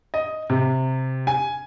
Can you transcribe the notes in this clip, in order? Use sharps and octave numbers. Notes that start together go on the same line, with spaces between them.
D#5
C3
G#5